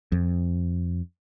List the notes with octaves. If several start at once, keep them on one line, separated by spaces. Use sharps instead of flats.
F2